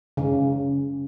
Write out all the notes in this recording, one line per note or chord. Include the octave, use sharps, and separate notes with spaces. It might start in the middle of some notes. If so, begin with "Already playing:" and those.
C#3